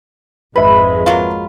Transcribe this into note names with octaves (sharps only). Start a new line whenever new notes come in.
G#1 F2 G#3 B4 E5 B5
F#3 A#3 F4